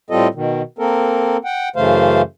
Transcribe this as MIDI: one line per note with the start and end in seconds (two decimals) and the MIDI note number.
0.10 0.28 45
0.10 0.28 55
0.10 0.28 60
0.10 0.28 65
0.10 0.28 69
0.10 0.28 75
0.34 0.62 47
0.34 0.62 51
0.79 1.37 58
0.79 1.37 60
0.79 1.37 69
0.79 1.37 70
1.44 1.69 78
1.44 1.69 79
1.76 2.22 42
1.76 2.22 49
1.76 2.22 52
1.76 2.22 57
1.76 2.22 72
1.76 2.22 77